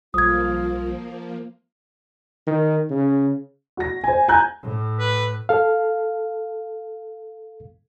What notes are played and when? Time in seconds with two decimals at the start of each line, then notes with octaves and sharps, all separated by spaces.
0.14 B1 F3 G3 A#3 F4 C5 D#6 G#6
2.47 D#3
2.90 C#3
3.77 F#4 A#6
4.04 C5 G#5
4.28 G#5 A#5 F#6 G6
4.62 A2
4.99 B4
5.49 A4 F5